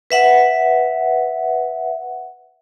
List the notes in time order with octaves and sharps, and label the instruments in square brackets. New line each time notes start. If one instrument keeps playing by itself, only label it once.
[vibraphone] B4 E5 F#5